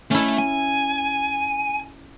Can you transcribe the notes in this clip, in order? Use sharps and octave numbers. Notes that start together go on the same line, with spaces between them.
A3 C#4 E4
G#5